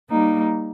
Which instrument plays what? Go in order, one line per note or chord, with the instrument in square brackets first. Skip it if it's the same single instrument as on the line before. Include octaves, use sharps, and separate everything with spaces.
[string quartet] G3 A#3 D#4